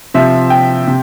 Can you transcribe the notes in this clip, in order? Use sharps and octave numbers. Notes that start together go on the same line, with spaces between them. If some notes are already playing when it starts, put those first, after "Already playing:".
C3 F3 C4 E5
G5
C3